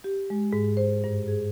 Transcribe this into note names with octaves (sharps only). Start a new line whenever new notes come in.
G4
G#3
G#2
C5
G2
G#4